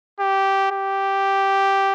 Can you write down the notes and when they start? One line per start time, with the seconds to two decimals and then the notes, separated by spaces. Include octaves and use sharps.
0.20 G4
0.71 G4